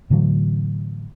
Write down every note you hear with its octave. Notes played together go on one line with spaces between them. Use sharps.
A2 D3 E3 F#3